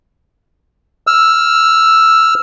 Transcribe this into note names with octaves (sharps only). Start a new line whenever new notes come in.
E6 F6